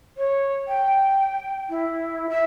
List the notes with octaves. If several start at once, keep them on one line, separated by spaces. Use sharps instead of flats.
C#5
G5
E4
E5